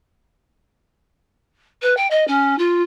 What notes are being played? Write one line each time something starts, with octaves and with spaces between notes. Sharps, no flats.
B4
G5
D#5
C#4
F4